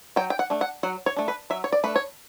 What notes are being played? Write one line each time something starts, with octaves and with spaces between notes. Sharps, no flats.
F#3 G5
G5
F#5
A3 D4
F#5
F#3 F#5
C#5
A3 D4
B4
F#3 E5
C#5
D5
A3 D4 B4
C#5